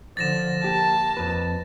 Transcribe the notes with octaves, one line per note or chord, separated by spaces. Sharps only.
D3 F3 A6 A#6 E7
A#3 G4 A5
F2 B4